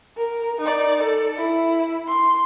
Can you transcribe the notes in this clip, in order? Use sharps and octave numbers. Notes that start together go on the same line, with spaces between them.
A#4
D#4 D5
A4
E4
C6